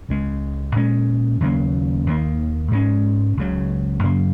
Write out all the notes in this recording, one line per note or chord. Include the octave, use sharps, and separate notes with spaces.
C#2 C#3 G#3
A#2 G#3 C#4
D#2 C#3 F#3 A#3
D#2 D#3 A#3
G#2 G#3 C#4
C#2 C#3 F#3
F#2 C#3 F#3 A#3